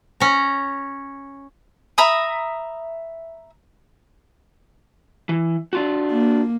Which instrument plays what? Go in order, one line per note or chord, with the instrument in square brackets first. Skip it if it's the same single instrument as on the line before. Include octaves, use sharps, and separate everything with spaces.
[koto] C#4 A#5
[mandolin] E5 A#5 B5 D#6
[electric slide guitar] E3
D4 F4 F#4
[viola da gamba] A#3